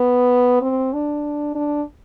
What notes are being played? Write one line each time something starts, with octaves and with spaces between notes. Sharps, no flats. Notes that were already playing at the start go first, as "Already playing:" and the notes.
Already playing: B3
C4
D4
D4